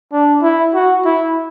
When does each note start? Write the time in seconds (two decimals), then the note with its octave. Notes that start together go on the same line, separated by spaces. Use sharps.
0.12 D4
0.42 E4
0.74 F#4
1.05 E4